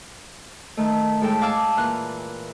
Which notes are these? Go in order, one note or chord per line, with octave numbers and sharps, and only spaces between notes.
D#3 A3
A2 G#3 A4 G5
F5 G#5 A5 D6 E6 F6
A#2 E3 F6 F#6